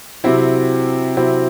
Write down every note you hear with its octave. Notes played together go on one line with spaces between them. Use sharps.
C3 F#3 C4 E4
C3 F#3 C4 E4